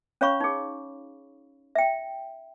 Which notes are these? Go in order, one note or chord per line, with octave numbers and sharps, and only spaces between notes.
C#4 C#5 F5 B5 C#6
D#4 G#4
E5 G5